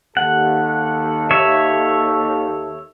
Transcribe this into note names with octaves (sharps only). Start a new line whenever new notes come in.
D#2 A4 F#5
C#5 E5